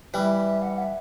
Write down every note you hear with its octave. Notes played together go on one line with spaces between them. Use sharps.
E3 G3 E5
F#5
E5